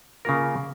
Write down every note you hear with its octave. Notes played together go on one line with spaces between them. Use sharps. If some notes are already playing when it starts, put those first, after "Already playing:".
C#3 A#3 F4 A#4